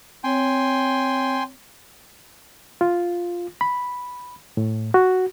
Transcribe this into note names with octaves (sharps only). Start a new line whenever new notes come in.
C4 C#5 G5 G#5 C6
F4
B5
A2
F#4